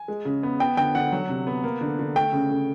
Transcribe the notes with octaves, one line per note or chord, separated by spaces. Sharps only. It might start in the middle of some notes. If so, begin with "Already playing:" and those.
Already playing: G#5
G#3
C#3
B3
B3 G5
D3 G5
D3 F#5
F#3
C3
B3
A#3
D3
D3
A3 G5
C#3
C#3